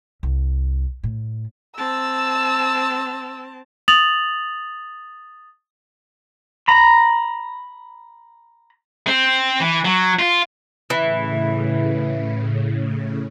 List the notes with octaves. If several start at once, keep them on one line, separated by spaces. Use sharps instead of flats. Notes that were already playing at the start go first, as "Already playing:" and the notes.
C2
A2
C4 A5 E6
D#6 A6 F7 F#7
A#5 B5
C4
E3
F#3
F4
A2 C#3 E3